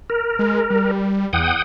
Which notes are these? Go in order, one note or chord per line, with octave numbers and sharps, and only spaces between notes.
A#4
G#3
G3
E2 F#5 G5 D#6